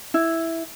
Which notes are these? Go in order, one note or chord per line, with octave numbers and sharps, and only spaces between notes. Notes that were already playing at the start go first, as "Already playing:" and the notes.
E4